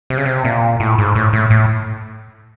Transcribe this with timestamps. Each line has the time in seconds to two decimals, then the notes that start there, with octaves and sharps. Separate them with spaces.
0.10 C3
0.18 C#3
0.25 C3
0.45 A#2
0.80 A2
0.98 G#2
1.15 A2
1.33 A2
1.50 A2